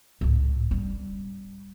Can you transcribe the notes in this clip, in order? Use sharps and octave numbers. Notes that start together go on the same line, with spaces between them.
C#2 A2
G3 C#4